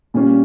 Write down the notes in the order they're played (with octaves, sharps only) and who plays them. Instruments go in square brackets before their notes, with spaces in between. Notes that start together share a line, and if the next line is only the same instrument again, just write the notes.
[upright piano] A#2 G3 C#4 F4